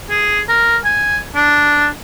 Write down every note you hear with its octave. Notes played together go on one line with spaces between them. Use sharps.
G#4
A#4
G#5
D4